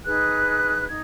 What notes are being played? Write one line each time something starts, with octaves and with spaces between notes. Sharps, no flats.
D#4 G#4 B4 F#6
D#4 G#6